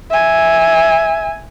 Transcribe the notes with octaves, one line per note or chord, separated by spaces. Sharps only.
E5 G#5